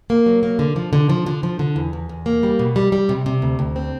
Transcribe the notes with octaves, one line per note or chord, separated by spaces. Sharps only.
A#3
F#3
A#3
D3
F3
D3
F3
D3
F3
D3
E2
E2
E2
A#3
G3
B2
G3
G3
C3
C3
D2
D2
C4